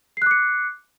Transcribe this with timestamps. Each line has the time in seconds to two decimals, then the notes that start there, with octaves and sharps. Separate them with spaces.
0.17 C7
0.22 F#6
0.26 D6
0.31 C#7